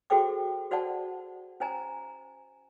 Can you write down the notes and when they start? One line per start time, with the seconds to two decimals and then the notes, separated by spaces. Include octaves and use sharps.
0.10 F#4 G#4 A4 C5 G5 D6
0.71 F#4 C5 D5 F#5 A5
1.60 C#4 C5 G#5 A#5